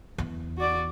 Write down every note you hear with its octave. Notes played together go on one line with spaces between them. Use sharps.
E2
F#4 D5